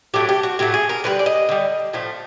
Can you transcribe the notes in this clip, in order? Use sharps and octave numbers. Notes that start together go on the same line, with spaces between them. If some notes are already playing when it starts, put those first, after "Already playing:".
A2 F#3 A3 G4
G4
F#4
A2 F#3 A3 G4
G#4
A#4
D3 G3 B4
D5
D#5
D3 G3
A2 F3 A3